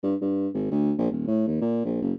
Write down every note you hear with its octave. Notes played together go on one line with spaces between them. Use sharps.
G2
G2
G#1
D2
A#1
D#1
A2
D#2
A#2
A#1
F#1